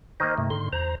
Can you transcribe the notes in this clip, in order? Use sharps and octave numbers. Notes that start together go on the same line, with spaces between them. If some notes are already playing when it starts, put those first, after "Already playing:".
D#3 A#3 C5 D#5
G2 C3 A3
G#2 D3 C6
E2 C5 A#5